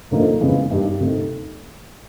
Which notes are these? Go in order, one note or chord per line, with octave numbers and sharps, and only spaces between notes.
D2 D3 F3 A#3 D#4
F2 C#3 E3 G#3 B3
G2 D#3 G3
D2 C3 D#3